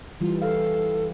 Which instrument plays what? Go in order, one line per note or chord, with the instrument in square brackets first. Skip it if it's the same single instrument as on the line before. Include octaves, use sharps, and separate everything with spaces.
[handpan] E3 G3 [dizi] F4
[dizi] A4 [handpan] F5